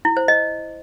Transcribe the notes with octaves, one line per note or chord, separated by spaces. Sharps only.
E4
C5
D#5